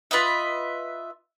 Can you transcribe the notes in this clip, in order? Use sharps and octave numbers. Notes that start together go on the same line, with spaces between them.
F4 B4 D#5 E5